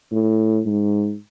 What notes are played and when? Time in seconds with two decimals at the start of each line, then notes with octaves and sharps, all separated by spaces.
0.11 A2
0.66 G#2